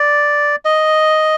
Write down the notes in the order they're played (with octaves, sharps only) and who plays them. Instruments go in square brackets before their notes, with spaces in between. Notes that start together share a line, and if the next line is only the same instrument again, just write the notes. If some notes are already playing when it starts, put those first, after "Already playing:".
Already playing: [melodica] D5
D#5